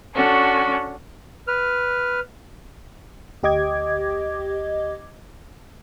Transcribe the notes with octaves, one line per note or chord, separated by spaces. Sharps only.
C#4 D4 F#4 A4
B4 F6
D2 G4 D#5 D6 G#6